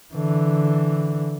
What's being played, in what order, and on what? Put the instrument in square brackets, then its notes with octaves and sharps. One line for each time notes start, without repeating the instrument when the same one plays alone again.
[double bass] D3 E3